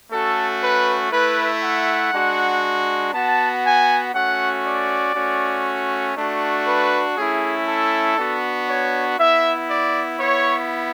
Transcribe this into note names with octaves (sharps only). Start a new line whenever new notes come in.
A3 C#4 F#4 A4
B4
A3 E4 B4
F#5
G#3 D4 F#4
B3 F#4 A5
G#5
A3 C#4 F#4 F#5
D5
A3 C#4 F#4
A3 D4 F#4
B4
A3 C#4 E4 G#4
A4
B3 D4 F#4
C#5
B3 E4 E5
D5
B3 E4 C#5